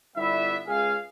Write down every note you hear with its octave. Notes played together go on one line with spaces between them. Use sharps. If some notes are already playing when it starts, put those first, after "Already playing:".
G1 G3 B3 E4 E5
C#2 G#4 F5